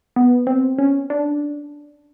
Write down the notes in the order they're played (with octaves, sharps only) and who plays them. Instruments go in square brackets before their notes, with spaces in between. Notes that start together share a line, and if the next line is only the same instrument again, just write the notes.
[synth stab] B3
C4
C#4
D4